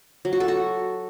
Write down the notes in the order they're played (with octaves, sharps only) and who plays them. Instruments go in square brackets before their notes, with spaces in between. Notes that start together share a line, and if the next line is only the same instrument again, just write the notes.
[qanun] F#3
F#4
A4
F#4